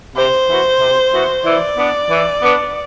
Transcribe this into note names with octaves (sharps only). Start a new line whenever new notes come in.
C3 C5
E3 B3 F#4
C3
E3 B3 F#4
E3 D5
B3 D4
E3
B3 D4